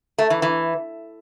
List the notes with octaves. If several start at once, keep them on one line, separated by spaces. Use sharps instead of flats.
A3
E3
E3